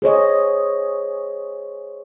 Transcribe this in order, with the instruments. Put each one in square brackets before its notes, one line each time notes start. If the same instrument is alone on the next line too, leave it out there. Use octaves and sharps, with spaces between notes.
[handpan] G#4 C5 C#5 D#5